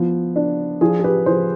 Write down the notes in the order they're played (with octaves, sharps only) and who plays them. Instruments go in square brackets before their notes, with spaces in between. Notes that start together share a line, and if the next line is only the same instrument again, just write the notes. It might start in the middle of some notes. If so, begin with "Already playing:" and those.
Already playing: [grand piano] F3 B3
D4
[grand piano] F3 [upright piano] F4 G#4
[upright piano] G#4
G4 B4
[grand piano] F3 [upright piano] G#4 C5